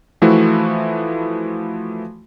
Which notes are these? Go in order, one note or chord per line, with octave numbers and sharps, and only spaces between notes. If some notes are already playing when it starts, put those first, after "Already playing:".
E3 F3 A3 E4 F#4